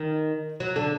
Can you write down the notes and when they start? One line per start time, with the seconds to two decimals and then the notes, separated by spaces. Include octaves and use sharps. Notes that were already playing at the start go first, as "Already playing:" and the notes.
Already playing: D#3
0.60 F#3
0.76 D3